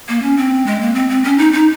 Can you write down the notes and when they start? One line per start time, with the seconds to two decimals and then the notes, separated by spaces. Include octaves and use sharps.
0.09 A#3
0.22 C#4
0.37 C4
0.67 G#3
0.81 A#3
0.95 C4
1.09 C4
1.24 C#4
1.38 D#4
1.53 D#4